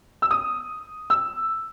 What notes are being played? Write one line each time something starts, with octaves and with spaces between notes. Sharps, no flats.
E6
D#6
E6